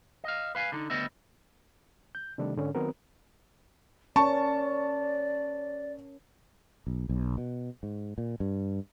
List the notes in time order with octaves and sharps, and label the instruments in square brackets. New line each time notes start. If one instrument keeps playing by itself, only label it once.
[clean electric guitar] D#5 F5
B4 F5 G#5
D3 D#4
D2 G3 B3 D#5 E5
[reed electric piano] G6
C3 D#3 G3 A3 D4
G#2 D3 C#4
D#3 F#3 B3 C4 F#4 A#4
[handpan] C#4 A#4 [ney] D5 [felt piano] A5 C#6
[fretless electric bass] B1
B1
B2
G#2
A#2
G2